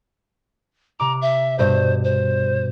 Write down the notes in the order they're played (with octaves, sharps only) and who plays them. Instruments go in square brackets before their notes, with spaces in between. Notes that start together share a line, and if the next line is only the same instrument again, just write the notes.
[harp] C3 D6 [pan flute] A#5
[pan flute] E5
[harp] G2 B2 G6 [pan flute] C5
[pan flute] C5